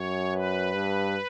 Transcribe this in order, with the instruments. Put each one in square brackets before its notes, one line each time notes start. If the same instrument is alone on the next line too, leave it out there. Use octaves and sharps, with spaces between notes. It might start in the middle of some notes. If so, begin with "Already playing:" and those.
Already playing: [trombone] F#2 [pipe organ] C#5
[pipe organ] B4
[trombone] G2